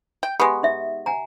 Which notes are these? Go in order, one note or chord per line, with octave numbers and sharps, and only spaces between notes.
G5
G#3 B3 G4
D#4 E5
F#5 G#5 A#5